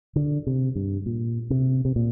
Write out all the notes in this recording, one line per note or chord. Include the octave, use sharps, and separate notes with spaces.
D3
C3
G2
A#2
C3
C3
A#2